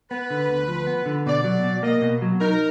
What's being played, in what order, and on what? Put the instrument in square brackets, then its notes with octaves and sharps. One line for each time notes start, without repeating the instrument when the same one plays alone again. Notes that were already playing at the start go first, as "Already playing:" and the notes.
[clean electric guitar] B3 [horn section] B4
[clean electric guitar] D3
D2
F3
B3
D3
[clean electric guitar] B2 [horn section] D5
[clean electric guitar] F#3
B2
[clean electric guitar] A#3 [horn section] D#5
[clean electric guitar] B2
F#3
[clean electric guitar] D#4 [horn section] A#4